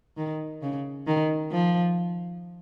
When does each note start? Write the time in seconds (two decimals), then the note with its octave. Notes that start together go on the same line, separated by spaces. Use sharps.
0.17 D#3
0.62 C#3
1.07 D#3
1.52 F3